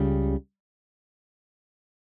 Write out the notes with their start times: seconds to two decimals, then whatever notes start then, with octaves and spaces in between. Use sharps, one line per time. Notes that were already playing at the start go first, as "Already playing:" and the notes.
Already playing: C#2 C#3 G3